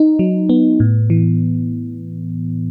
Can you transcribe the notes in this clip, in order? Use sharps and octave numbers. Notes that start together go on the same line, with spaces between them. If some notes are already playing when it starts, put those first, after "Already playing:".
Already playing: D#4
F#3
B3
A2
E3